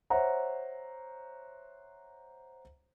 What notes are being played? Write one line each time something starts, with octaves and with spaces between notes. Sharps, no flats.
C5 C#5 E5 F#5 A#5